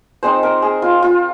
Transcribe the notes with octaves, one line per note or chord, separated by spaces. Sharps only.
G#3 C4 D#4 C5
A#4
G#4
F4
F4